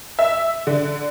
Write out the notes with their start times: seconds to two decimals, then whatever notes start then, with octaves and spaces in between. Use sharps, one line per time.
0.19 E5
0.67 D3